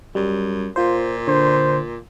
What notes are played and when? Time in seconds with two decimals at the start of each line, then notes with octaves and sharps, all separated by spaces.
0.15 F#2 G3
0.76 A#2 F4 C5
1.27 D3 C5